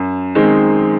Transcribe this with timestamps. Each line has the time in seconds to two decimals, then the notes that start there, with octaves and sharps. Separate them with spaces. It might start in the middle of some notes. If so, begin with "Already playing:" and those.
Already playing: F#2
0.35 D#3 G#3 C4 D#4